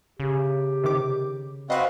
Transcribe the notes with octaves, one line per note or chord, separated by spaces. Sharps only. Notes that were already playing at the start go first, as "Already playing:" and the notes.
C#3 G4
C3 D#3 D6
C4 F#4 B4 D#5 F5 F#5 F#6